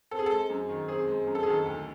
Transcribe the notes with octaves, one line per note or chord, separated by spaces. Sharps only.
C4 A4
G#4
G#3 A4
F#2
D#3
C4 G#4
G#3
F#2
A4
G#4
D#3 A4
D2